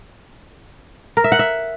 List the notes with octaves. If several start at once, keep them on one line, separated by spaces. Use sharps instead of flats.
A#4
E5
F#5
E5